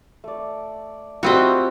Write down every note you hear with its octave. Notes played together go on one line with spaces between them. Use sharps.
A3 D5
G3 C4 F4 F#4 D#5 E5